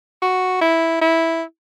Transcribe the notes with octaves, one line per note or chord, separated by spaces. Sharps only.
F#4
E4
E4